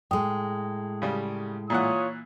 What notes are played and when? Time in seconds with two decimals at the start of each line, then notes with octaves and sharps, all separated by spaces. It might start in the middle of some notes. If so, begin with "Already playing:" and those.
0.11 A2 G#3 G5 D#6
1.02 C#3 G3
1.70 A#2 E3 F4 C#5 F#5 D#6